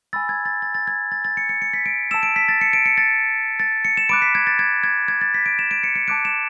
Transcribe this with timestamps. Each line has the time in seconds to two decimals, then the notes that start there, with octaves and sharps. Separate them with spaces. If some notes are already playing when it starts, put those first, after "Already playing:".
0.13 G#5 B5 E6 A6
0.29 G#6
0.45 A6
0.62 A6
0.75 A6
0.87 G#6
1.12 A6
1.25 A6
1.37 C#7
1.49 C#7
1.62 C#7
1.73 B6
1.86 D7
2.11 A5 E6 E7
2.23 D7
2.36 B6
2.49 A6
2.61 C#7
2.73 D7
2.86 C#7
2.98 A6
3.60 A6
3.85 C#7
3.97 E7
4.09 B5 D6 F#6 D7
4.22 B6
4.35 G#6
4.47 A6
4.59 G#6
4.84 G#6
5.08 G#6
5.21 A6
5.34 B6
5.46 D7
5.59 E7
5.71 D7
5.84 C#7
5.96 C#7
6.08 A5 D6 F#6 D7
6.25 E7